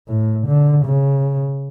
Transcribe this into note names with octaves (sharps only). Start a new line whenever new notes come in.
A2
D3
C#3